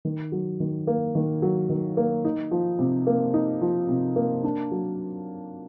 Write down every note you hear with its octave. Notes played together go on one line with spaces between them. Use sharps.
D#3
F#3
D#3
A#3
D#3
F#3
D#3
A#3
D#4
F3
C3
A#3
D#4
F3
C3
A#3
D4
F#3